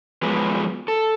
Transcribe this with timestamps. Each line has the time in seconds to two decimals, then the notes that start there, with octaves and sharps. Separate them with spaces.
0.23 F3 F#3 G#3 B3 G#4 B4
0.88 A4